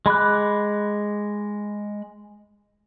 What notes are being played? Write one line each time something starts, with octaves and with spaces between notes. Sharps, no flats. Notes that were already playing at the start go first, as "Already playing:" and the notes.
G#3 B5 D6 F#6